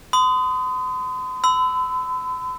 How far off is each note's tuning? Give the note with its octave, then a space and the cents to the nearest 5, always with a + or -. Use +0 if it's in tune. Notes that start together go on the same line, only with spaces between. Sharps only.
C6 -45 D#6 +0
B5 +45 E6 -10